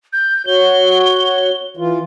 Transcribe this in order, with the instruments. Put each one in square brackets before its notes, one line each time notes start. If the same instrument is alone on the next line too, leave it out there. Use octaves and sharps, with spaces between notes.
[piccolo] G6
[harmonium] F#4 C#5 [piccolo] G7
[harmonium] E3 F4